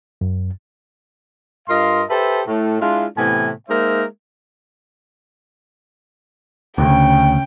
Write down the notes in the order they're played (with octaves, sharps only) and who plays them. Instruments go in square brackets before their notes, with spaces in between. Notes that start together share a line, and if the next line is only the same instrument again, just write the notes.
[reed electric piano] F#2
[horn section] G2 F4 A#4 D#5 F5 C6
G4 A4 B4 C5 E5 A5
A2 A3
G#3 D4 E4 F4
A2 C3 E3 B3 G5 G#5
G#3 A#3 D#4 A#4 C5 E5
[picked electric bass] D2 [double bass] C#3 [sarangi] G5